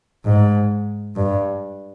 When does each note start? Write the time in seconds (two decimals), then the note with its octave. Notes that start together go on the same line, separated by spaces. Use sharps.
0.25 G#2
1.16 G2